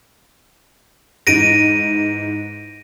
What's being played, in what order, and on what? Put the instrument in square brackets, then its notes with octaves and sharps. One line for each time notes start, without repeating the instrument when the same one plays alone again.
[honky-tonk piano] G#2 E3 [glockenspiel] A#6 D7 D#7